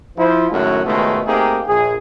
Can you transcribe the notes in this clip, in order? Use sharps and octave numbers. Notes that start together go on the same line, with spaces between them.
F3 E4 C5
F#2 A2 D#3 G#3 C#4 F#4
C#2 G#2 B2 D#3 G#3 A3
A3 A#3 C4 D#4 G4 G#4
A#1 G#4